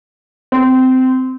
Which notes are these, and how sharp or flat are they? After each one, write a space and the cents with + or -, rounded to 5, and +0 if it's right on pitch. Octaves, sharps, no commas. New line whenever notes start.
C4 -20